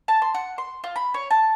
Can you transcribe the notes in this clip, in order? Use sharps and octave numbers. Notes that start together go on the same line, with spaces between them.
A5
C6
F#5
C6
F4
B5
C#5
A5